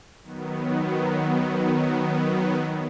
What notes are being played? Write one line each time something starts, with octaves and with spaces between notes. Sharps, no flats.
D#3 F#3 B3